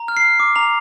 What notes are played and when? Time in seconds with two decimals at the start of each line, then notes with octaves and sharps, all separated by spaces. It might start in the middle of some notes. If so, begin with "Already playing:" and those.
Already playing: A#5
0.08 F6
0.17 C7
0.25 F6
0.40 D6
0.56 A#5 F7